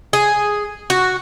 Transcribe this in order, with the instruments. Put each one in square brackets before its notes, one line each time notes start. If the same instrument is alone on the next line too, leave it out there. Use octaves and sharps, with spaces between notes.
[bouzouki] G#4
F#4